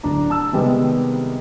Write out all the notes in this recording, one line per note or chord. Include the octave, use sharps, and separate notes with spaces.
D1 D4 A#5
A5 E6
C3 D#3 G3 G#3 B3